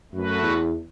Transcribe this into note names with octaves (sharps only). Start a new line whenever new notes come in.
F#2 A3 F#4 B4
E2